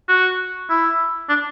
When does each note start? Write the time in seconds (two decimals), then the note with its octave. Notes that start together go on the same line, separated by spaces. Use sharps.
0.09 F#4
0.70 E4
1.29 D4